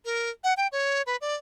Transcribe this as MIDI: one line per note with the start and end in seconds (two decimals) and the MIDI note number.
0.05 0.30 70
0.44 0.53 78
0.57 0.67 79
0.72 1.02 73
1.06 1.16 71
1.21 1.35 74